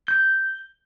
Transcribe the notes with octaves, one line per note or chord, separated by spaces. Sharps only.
G6